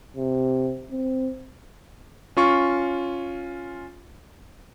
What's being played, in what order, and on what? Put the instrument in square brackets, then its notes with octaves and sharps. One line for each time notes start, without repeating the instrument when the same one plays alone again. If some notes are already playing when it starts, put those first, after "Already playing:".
[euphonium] C3
C4
[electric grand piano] C#4 F4 C#6